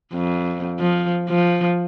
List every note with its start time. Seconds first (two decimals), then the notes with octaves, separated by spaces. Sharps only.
0.13 F2
0.79 F3
1.29 F3